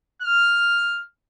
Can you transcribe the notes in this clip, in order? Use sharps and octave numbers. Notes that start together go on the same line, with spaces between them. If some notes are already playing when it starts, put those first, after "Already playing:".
F6